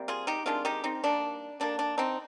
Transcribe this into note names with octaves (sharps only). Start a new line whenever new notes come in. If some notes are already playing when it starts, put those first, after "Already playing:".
Already playing: C3 G3 A#3
F4 G#4
D#4 G4
C3 D#3 G#3 D4 F4
D#4 G4
C4 D#4
D#3 G3 A#3 D4
D3 G3 A#3 D4
D4
C4 D#4